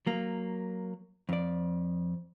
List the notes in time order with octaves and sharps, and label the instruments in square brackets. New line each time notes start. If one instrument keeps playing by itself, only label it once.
[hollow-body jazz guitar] F#3 A#3
F2 D5